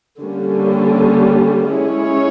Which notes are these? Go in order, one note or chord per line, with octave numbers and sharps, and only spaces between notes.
D3 G3 A#3 C#4
G#3 C#4 E4 G#4 C#5